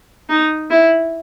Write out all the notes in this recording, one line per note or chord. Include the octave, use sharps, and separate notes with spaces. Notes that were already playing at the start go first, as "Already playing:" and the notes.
D#4
E4